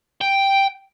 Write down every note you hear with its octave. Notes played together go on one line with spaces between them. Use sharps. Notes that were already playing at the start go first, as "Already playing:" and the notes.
G5